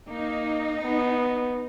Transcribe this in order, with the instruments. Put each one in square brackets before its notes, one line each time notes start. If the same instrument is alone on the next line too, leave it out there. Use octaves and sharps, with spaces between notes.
[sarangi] A#3 [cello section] D#4
[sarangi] B3